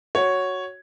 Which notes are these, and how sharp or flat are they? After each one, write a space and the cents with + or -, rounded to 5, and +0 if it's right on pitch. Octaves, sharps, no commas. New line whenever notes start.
F#4 +0 C#5 +0